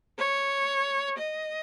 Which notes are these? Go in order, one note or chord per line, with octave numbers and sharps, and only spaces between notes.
C#5
D#5